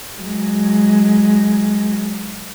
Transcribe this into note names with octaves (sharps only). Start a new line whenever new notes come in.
F#3 G#3